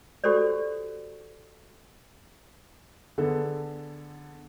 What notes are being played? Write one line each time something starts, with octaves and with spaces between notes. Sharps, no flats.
F#4 G4 A4 C5 D5
D3 B3 G#4 A4